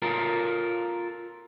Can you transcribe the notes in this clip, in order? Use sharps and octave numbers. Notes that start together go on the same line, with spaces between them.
F4 A4 A#4